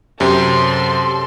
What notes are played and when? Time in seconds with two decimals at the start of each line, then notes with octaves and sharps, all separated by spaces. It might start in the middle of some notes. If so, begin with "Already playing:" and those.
0.20 F#2 C3 A4 C6